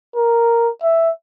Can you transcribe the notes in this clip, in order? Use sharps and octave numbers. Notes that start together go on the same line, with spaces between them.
A#4
E5